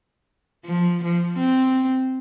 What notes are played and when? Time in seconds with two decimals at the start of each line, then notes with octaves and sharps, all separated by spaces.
0.65 F3
1.04 F3
1.38 C4